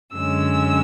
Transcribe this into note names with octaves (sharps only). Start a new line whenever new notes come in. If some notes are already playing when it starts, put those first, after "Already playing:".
F#2 D3 G#3 C#4 E6